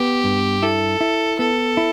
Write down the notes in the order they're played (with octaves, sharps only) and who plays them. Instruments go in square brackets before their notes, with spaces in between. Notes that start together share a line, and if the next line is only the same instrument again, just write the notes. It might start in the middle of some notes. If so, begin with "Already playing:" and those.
Already playing: [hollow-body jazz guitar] B3 [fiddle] G4
[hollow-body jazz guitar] G2
[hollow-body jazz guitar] E4 [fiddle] A4
[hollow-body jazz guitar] E4
[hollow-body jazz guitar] B3 [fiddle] A4
[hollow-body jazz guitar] E4